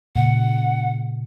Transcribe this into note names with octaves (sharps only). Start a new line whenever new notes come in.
A#2 C#3 F#5